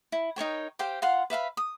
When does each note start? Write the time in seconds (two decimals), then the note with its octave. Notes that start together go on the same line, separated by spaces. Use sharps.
0.12 E4
0.36 D#4 A#4 C#5 G5
0.79 G4 C5 F5 G5
1.02 F4 F5 F#5 C6
1.30 B4 E5 F5 B5
1.57 D#6